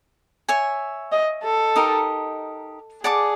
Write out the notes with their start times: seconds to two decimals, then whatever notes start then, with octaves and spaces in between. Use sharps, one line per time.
0.49 C#5 E5 G#5
1.12 D#5
1.44 A4
1.76 D#4 G4 A#4 D#5
3.03 G#4 D5 F#5 A5 D6